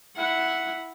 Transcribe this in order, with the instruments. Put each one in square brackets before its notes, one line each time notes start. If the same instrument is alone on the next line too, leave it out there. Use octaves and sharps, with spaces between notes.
[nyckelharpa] E4 F#5